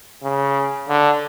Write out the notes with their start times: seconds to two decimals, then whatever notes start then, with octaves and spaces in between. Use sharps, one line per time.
0.23 C#3
0.88 D3